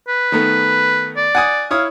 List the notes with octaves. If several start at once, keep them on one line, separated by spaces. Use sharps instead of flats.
B4
D#3 A3 B3
D5
F#5 G#5 D#6
E4 C#5 F5 D#6